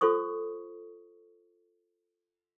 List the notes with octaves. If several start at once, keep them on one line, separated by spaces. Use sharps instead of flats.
F4 A4 C5 C#6 D#6